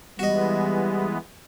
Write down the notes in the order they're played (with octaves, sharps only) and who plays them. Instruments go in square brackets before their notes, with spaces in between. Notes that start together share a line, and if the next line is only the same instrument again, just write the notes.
[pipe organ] E3 G#3 B3 [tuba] G3 [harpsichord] F#4 D#5